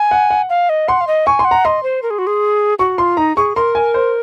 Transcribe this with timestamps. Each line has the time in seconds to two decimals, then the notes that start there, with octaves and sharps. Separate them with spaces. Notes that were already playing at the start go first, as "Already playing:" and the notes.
Already playing: G#5
0.11 F#5
0.30 F#5
0.49 F5
0.69 D#5
0.88 F#5 C6
1.01 F5
1.07 D#5
1.27 G#5 C#6
1.39 C6
1.45 F#5
1.51 A#5
1.65 D#5 C6
1.83 C5
2.03 A#4
2.10 G#4
2.19 F#4
2.27 G#4
2.79 F#4 C#6
2.98 F4 C6
3.17 D#4 A#5
3.36 G#4 C#6
3.56 A#4 C6
3.75 G#5
3.94 C5